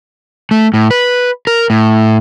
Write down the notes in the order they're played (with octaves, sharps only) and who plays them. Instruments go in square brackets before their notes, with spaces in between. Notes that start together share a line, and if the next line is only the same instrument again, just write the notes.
[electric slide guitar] A3
A2
B4
A#4
A2